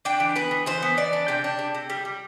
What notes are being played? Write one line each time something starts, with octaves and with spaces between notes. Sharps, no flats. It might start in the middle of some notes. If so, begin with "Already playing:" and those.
D4 G5
E3
B3 B4
E3
E3 C5
B3
E3 D5
D4
C3 G5
D4
C3
C3
G3
G3